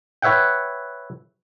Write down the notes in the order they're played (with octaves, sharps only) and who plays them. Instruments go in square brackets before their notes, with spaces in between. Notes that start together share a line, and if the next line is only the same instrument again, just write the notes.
[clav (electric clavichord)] B4 C#5 E5 F#5 G5